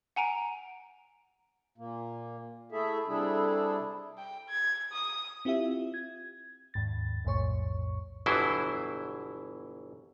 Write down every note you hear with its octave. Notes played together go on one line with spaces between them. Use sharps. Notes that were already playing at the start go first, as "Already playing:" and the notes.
F#5 G#5 A#5 D7
A#2 A#3
A3 E4 G#4 A4 E5
C3 G3 D4 E4 G#4 A4
G5
G#6
D#6
C4 E4 F4 G4 E5
G#6
D#2 G#2 A6
B1 F2 A2 C#5 C#6
G1 B2 E3 F#3 E4 C5